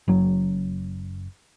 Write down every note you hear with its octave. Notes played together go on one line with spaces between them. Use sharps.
F#1 F#2 F#3